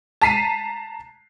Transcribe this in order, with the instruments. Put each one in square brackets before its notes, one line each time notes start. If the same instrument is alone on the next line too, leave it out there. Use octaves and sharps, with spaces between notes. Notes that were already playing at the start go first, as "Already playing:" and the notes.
[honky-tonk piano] A5 A#5 B6 C7 D#7